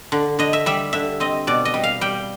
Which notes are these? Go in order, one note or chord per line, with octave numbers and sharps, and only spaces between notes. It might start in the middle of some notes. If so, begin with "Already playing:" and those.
D3
D3 D#5
E5
G3 E5
D3 E5
C4 D#5
B2 D5
D#5
G3
F5
G3 G5